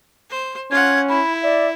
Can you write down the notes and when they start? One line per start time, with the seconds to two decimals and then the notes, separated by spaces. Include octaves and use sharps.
0.30 C5
0.71 C#4 F4 F#5 G#6
1.09 E4 B5
1.43 D5 E5